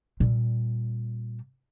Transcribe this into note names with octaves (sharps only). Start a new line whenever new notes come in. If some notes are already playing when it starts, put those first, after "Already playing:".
A#2 G3